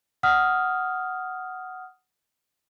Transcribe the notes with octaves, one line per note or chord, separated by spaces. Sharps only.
F#5 D#6 F6